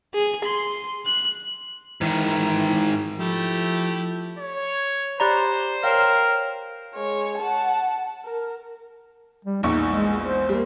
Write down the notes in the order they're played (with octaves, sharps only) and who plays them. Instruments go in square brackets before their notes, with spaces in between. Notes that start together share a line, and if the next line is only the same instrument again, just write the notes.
[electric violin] G#4
C6
F#6
[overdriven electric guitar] G#2 D#3 [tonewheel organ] E3
[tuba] F3 [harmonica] A3 E4 G4
[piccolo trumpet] C#5
[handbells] G4 D5 A#5 [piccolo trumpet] C5 [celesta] B5 F#6
[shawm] A#4 [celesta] C#5 G5 E7 [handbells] F5
[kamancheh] G#3 C#5
F#5 A5
A#4
[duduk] G3
[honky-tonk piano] A#1 E2 C#6 [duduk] D#4
[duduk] G#3
C5
[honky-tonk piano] G3 A#3